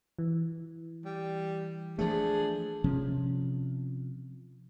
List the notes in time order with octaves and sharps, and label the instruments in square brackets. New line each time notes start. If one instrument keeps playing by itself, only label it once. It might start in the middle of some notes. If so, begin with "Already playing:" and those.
[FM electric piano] E3
[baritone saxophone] G3
[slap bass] F3 A3 [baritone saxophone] D4 [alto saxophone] G#4
[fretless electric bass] C3 F3 C#4